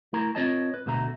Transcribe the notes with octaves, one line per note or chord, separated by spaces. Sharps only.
A3 E4 A#4 A#5
C4 F4 A#4 C#5 D#5 A5
B4
D2 B2 A3 A#5